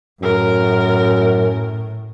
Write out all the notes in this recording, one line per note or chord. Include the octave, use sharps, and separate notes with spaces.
F#2 A2 A#4